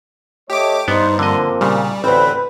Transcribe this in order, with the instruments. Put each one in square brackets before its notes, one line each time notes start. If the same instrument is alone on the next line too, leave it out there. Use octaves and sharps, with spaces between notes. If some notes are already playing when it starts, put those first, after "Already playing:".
[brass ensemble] A3 C#5 D#5 [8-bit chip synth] G4 D6
[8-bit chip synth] G2 [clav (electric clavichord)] B3 [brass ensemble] D#4 C5
[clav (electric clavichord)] D3 D#5 [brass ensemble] F3 A#3 C4
[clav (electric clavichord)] A#2 C#3 [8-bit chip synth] G3
[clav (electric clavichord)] A1 D2 [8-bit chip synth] C4 [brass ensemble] B4